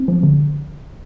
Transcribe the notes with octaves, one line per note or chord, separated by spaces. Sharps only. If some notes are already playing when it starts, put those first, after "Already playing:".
Already playing: C4
F3
D3